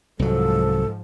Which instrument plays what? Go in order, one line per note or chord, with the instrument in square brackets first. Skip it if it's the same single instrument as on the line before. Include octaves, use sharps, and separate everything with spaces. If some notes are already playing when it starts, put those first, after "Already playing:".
[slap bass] C2 F#3 [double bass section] G#2 F3 [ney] A4